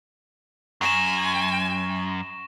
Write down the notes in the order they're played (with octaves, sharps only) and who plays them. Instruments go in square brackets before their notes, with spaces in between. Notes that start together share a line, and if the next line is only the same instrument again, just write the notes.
[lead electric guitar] F#2 [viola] G#5 [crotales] C#6 A#6 E7